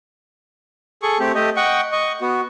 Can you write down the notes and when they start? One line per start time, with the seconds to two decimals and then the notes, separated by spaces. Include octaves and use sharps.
1.02 G#4 A4 C#6
1.20 A3 C4 G4
1.35 A3 G4 D#5
1.56 D#5 F#5 G5 C#6
1.92 D#5 C#6
2.21 B3 F#4